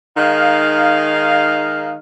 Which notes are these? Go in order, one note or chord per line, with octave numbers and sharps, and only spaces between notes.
D#3 G#3 D#4 F5